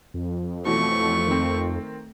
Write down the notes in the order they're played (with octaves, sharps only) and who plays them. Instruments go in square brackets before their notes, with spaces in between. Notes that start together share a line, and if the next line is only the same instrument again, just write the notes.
[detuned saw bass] F2
[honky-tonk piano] B2 E3 F#3 [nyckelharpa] A3 C#6
[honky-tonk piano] D#3 C4